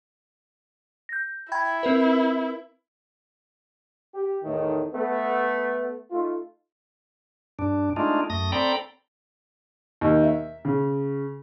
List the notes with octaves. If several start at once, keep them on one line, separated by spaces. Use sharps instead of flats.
G6 A#6
E4 G5 B5 G#6
C4 A#4 B4
G4
E2 A2 D#3 A3 D#4
A3 B3
A3 D#4 F4
G2 D4
G#3 A3 D4 D#4 F4
F#2 A3 D#6 A#6
C4 A4 D5 G5 A#5 B5
D#2
E5
C#3